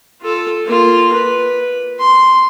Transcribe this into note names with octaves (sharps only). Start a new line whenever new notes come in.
F4 A4
A#3 F4
B4
C6